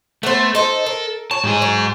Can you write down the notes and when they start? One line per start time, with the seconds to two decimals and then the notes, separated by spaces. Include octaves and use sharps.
0.23 A3 B3 C5
0.55 D#4 A4 C5
0.86 A#4
1.31 C#5 A5
1.44 G#2 G#4
1.62 F#3